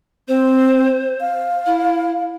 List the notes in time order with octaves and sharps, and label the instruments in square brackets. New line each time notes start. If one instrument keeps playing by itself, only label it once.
[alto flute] C4 [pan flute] C5
[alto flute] F5
[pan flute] E4